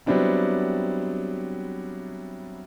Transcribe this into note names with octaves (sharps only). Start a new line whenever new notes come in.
F#3 G3 B3 C4 D4 E4